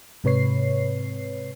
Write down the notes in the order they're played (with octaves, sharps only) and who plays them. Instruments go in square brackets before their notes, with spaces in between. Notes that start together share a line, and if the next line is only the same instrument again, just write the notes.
[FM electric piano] G#2 C3 B4 C#5 C7